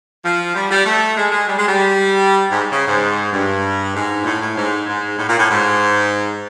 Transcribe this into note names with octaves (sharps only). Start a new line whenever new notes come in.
F3
G3
G3
A3
G#3
G#3
G3
G#3
G3
G#2
C#3
G#2
G2
G#2
A#2
A2
A2
G#2
G#2
A2
A#2
A2
G#2